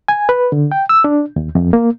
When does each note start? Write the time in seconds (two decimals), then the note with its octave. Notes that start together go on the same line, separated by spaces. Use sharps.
0.08 G#5
0.29 B4
0.52 D3
0.72 G5
0.89 E6
1.04 D4
1.36 D#2
1.55 F2
1.73 A#3